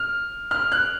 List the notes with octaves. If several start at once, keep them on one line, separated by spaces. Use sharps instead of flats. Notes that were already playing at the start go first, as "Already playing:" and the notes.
Already playing: F6
F6
F#6